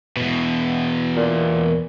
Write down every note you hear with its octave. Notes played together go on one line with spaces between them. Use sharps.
E2 B2
A#2